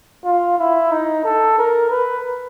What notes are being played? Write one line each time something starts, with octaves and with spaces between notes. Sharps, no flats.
F4
E4
D#4
A4
A#4
B4